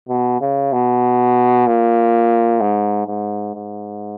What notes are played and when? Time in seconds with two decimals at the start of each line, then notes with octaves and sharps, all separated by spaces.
0.09 B2
0.41 C#3
0.72 B2
1.67 A#2
2.60 G#2
3.08 G#2
3.55 G#2